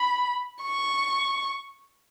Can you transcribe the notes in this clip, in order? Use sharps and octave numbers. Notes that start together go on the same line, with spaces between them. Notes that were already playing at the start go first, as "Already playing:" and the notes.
Already playing: B5
C#6